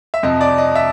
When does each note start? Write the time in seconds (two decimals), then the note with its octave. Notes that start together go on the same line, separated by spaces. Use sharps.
0.14 E5
0.23 F2 C3 F3 D#5
0.41 D5
0.58 D#5
0.75 E5